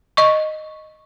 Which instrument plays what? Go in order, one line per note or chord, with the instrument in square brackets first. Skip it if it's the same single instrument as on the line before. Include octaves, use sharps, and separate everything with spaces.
[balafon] D#5 C#6